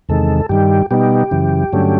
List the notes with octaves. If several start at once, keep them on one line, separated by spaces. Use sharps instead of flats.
E2 C3 D#3 G#3 A4
G2 D#3 G3 G4
B2 G3 B3 D#4 G4
F#2 C#3 E3
G2 D3 F#3 A3 C#4